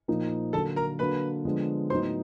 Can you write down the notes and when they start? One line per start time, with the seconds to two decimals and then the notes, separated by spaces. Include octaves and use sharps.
0.08 A#2 F3 A#3 D#4
0.53 D3 F#3 A#3 A4 A5
0.76 A#4 A#5
0.99 D3 F#3 A#3 B4 B5
1.45 D3 F3 G#3 B3 D4
1.90 A2 F#3 B3 D#4 C5 C6